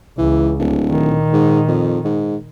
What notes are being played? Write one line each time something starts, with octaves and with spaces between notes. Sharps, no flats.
C#2 E3
D1
A#2 D#3
G#2
F2
G#2